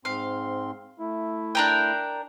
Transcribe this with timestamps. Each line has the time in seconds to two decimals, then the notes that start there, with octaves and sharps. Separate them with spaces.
0.05 G#2 C4 F5 C6
0.99 A3 E4
1.55 D4 A#4 G5